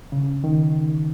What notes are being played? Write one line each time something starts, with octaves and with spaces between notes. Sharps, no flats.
C#3
D#3